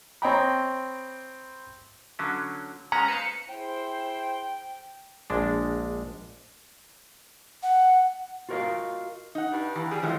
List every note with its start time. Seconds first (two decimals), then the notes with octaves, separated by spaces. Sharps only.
0.22 C4 C#5 D#5 G5 A#5 B5
2.19 D3 F#3 C#4
2.92 G#3 C#4 F#5 A#5
3.08 B4 C5 F5 C#7
3.49 E4 G#4 C5 G5
5.30 A#1 G#3 D4
7.63 F#5
8.49 F4 F#4 A#4 C#5 D#5 F5
9.35 D#4 F#5
9.53 G2
9.75 D#2 E3
9.91 G3 G#4
10.02 A2 E3 F3 G#3